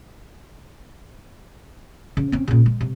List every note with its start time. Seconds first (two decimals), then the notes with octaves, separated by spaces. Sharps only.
2.17 C#3
2.32 C4 C#4
2.48 A#2 C#3
2.66 G#3
2.81 C3